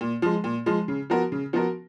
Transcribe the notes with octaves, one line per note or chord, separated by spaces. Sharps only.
A#2
F3 G#3
A#2
F3 G#3
C#3
F3 B3 F#4 A#4
C#3
F3 B3 F#4 A#4